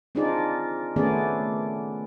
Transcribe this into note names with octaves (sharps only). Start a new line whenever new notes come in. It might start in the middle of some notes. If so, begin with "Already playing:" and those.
C4 D4 D#4 F4 G#4 D5
D#3 A3 B3 C#4 G#4 D5